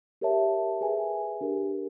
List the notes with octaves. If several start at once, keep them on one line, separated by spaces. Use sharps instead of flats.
G4 A#4 C#5 E5 A5
G#4 B4 E5 G#5
D4 G4 A#4